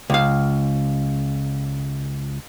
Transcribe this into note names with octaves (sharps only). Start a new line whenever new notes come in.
C#2 F5